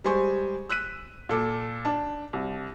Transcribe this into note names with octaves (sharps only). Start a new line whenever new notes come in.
G3 G#3 C5 G#5 C#6
E6 F#6 B6 D#7
A#2 A4 D6
D4 A5
C2